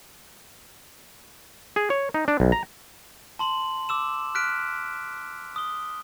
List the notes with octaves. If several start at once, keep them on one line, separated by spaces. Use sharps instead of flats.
G#4
C#5
D#4
D4
B1
A#5
A5 C6 F#7
D6 E6 E7
F6 F#6 B6 D7
D#6 G7